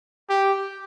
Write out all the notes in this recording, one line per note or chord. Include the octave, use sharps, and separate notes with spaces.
G4